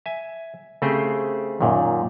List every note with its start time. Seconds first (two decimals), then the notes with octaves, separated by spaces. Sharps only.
0.06 E5 G#5
0.82 C#3 A3 C4 G4 G#4 C5
1.61 F#2 A#2 D#3